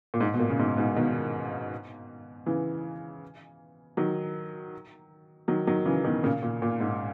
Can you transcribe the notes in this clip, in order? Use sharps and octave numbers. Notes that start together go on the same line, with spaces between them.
A#2
G#2
B2
A#2
C#3
G#2 B2
G#2 B2
B2 D#3
C#3 E3
D#3 F#3
D#3 F#3
D#3 F#3
C#3 E3
B2 D#3
A#2 C#3
A#2
A#2
G#2